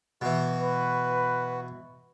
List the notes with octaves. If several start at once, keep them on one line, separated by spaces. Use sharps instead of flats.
B2 E3 F#4
B4